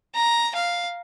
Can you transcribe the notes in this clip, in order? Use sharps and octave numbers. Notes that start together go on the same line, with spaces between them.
A#5
F5